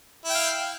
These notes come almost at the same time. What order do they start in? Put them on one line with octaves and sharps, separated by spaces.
E4 G5 F5